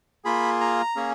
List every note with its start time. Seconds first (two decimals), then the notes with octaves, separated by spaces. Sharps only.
0.24 A#3 F4 G#4 B5
0.61 A#5
0.96 A#3 C#4 G#4